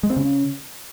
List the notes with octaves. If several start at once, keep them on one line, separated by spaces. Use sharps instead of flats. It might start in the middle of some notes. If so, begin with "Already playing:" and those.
G#3
C4
C#3